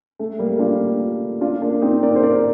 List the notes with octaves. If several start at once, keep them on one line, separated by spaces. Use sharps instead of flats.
A3
G3 A#3
D4 F4
D4 F4
A#3 D4
C4 D#4
A#4 D5
C5
A#4 D5